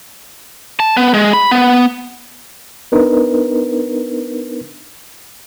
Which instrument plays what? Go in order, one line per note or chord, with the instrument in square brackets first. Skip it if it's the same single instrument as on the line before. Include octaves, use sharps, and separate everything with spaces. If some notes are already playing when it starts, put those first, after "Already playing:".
[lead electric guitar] A5
B3
G#3
B5
B3
[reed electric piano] B3 D4 D#4 A#4 B4